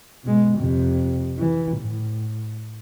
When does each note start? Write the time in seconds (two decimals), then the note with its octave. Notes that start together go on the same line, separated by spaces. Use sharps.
0.24 B2 G#3
0.58 F2 C3
1.38 E3
1.77 A2